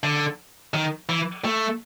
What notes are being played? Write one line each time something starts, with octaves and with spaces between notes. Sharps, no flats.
D3
D#3
E3
A3